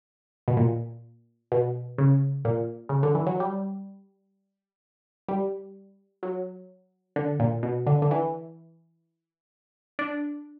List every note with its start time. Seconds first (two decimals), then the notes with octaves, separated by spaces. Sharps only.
0.48 B2
0.57 A#2
1.52 B2
1.98 C#3
2.45 A#2
2.89 C#3
3.03 D3
3.15 E3
3.27 F#3
3.40 G3
5.29 G3
6.23 F#3
7.16 D3
7.40 A#2
7.63 B2
7.87 D3
8.02 D3
8.11 E3
9.99 D4